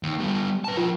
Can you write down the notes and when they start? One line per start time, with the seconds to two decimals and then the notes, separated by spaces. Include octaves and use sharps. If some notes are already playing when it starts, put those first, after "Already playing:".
0.03 D#2
0.19 G3 B3
0.64 B4 A5
0.77 F3 F4 A#4